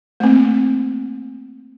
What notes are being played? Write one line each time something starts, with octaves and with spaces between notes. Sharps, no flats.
A3 A#3 C4